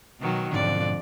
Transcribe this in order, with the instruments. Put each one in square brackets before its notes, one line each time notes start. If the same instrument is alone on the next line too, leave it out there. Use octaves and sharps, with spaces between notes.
[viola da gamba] B2 D#3 F#3
[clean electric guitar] B1 G#2 D3 [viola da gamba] F2 D5